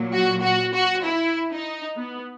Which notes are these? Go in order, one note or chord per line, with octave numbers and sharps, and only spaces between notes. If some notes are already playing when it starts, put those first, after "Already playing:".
Already playing: A#2 F#3
F#4
F#4
F#4
E4
D#4
B3